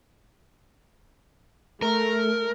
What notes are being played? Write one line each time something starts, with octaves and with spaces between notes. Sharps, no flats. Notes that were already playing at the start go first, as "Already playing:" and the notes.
A3 A#4